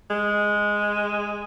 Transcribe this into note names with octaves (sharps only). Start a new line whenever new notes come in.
G#3